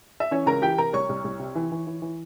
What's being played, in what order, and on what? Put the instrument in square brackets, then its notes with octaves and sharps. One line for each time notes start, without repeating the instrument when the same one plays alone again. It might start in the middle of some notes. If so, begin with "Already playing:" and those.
[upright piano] E5
E3 C#4 C#5
C#2 A#4 A#5
E3 G4 G5
C3 A#4 A#5
C2 C#5 C#6
C2
C2
C3
E3
E3
E3
E3